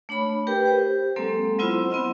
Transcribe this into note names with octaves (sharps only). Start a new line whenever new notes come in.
A3 D4 C#5 B5
G4 A#4 B4 G5
G4 C5
F#3 G#3 A#3 C4 A4
F#3 B3 C4 E4 F4 C5
B3 C4 E4 D#5